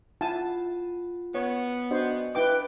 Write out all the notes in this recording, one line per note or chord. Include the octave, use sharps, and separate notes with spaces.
E4 F4 F#5 G#5 A5
B3 C#5
D4 F#4 C5 D#5
E4 B4 G5 D6